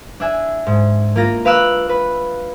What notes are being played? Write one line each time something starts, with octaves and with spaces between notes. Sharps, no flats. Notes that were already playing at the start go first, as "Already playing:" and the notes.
D4 E5 G#5
G#2
A#3 F4 A#6
B4 F5 D6 E6 F#6
B4